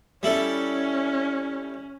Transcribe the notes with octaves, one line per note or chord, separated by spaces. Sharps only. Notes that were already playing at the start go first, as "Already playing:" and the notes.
G3 C#4 E4 A4